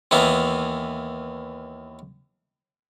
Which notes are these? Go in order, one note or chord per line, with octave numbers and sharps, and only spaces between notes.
D#2 E3 A#3 B3